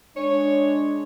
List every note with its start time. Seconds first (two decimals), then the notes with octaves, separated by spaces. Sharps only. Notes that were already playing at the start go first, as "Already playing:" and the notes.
0.17 G#3 D4 C#5